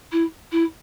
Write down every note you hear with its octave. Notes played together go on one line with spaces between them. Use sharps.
E4
E4